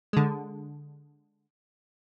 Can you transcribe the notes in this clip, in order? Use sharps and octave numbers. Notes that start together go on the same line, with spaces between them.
D3 G#3